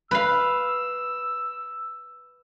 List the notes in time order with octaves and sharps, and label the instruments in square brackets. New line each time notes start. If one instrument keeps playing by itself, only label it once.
[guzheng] B4 F5 [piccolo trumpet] E6